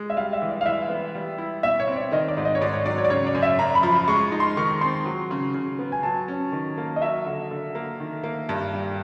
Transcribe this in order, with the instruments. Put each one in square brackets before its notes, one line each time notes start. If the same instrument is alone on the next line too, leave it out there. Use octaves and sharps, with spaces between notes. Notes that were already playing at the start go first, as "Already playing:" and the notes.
Already playing: [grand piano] G#3
[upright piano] E5
[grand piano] G3 [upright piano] F5
[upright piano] E5
[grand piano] E3
[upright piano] D5
F5
[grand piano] E3 [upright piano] E5
[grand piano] B3
G3
E4
[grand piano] B2 [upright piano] E5
[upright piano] C#5
[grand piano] C4
[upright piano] D5
[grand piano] D#3 [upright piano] D#5
[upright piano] D5
[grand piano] G#2
[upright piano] D#5
C#5
[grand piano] G#2 [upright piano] D5
[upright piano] C#5
[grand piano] F#3 [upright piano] D5
[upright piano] C#5
D5
[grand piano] C#3 [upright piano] C#5
[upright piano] D5
[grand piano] F#2
[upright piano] E5
[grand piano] F#2 [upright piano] A#5
[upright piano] B5
[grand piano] F3
[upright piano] B5
[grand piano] G#3 [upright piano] C#6
[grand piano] D#4
[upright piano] C6
[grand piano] D#3 [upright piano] C#6
[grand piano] C4 [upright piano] C6
[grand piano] F#3
C#3
C#3
B3
[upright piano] G#5
[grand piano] F#3 [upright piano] A5
[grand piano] C#4
D#3
A#3
[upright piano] D#5
[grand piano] F#3 [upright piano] E5
[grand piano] D3
D3
A#3
D#3
A#3
G2
G3